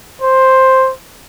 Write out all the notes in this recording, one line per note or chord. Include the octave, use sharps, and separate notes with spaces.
C5